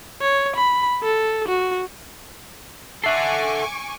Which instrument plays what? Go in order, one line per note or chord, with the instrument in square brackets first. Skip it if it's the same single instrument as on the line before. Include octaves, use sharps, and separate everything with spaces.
[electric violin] C#5
B5
A4
F#4
[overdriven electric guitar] A4 F#5 [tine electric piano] E5 C7 [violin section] G#5 C#6 D6